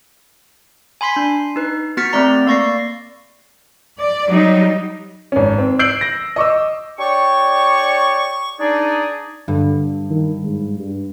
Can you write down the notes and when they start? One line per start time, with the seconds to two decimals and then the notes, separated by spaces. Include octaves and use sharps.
1.01 G#5 B5 C6 B6 C7
1.16 D4
1.56 D#4 B4
1.97 B3 F#4 F6 A6 B6 C#7
2.13 A3 B3 C4 D5 A#5
2.47 A#3 D5 C#6 A#6 C7
3.98 D5
4.28 F#3 G3 D#4
5.32 G#1 C#4
5.58 C4
5.79 E6 G6 C7 D7 F#7
6.01 A#6
6.36 D#5 C#6 D6 E6
6.99 D4 G4 C#5 D5 C#6
8.60 D4 D#4 G#4 D5
9.48 G2 D3
10.10 D#3
10.42 G#2
10.79 G2